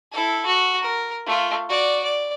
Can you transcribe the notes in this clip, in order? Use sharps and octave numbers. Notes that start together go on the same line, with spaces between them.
E4 A4
F#4
A#4
A3 F4
F#4 D5
D5